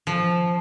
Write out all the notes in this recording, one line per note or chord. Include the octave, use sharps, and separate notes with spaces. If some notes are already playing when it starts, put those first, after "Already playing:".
F3